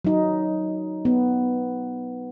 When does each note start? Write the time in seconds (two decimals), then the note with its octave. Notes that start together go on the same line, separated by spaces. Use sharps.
0.05 F#3 D#4
1.05 B3